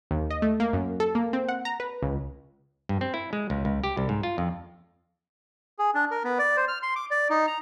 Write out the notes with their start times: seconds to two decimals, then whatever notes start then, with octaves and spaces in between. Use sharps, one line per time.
0.11 D#2
0.30 D#5
0.42 A3
0.60 A#3
0.73 F#2
1.00 A4
1.15 A#3
1.33 C4
1.49 F#5
1.65 A#5
1.80 B4
2.03 C#2
2.89 G2
3.01 C4
3.14 E4
3.33 G#3
3.50 C#2
3.65 C#2
3.84 G4
3.97 C2
4.09 G#2
4.23 F4
4.38 F2
5.79 G#4
5.95 D4
6.11 A#4
6.24 B3
6.39 D5
6.57 C5
6.68 F6
6.83 C6
6.96 D6
7.11 D5
7.30 D#4
7.47 A#5